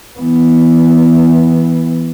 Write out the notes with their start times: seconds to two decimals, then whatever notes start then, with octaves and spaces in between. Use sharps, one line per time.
0.20 E3 B3